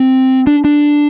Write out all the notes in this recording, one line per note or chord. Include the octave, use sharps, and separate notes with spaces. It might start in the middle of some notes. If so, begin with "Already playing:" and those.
Already playing: C4
D4
D4